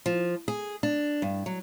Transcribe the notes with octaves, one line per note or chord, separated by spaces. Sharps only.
F3
G#4
D4
G2
F#3